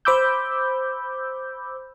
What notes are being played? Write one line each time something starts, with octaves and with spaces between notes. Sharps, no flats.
C5 B5 D6 E6 G6